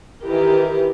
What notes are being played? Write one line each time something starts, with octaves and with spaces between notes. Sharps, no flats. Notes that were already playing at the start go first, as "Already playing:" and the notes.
D#3 E3 G4 A#4